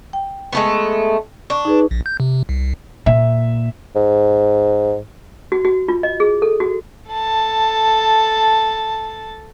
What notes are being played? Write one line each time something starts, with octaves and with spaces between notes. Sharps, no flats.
G5
G#3 A3 B3
D4 C#6
D#4 G#4 B4
A#1
G6
C3
C2
A#2 E5
G#2
F#4
F#4
F4
D#5
G#4
A4
F#4
A4 A5